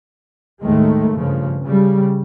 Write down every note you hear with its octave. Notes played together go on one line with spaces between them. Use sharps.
D#2 A2 D#3 G#3 A3
G2 C#3 F3
C#3 G3